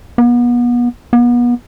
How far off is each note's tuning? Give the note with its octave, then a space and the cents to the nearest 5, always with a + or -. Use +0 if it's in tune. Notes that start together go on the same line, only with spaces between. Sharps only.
B3 -35
B3 -35